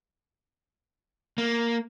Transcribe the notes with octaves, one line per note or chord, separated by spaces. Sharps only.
A#3